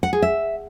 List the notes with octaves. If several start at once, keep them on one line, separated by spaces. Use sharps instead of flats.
F#5
G#4
E5